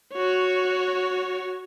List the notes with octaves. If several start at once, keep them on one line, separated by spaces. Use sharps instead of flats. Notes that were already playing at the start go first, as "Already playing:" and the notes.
F#4 C#5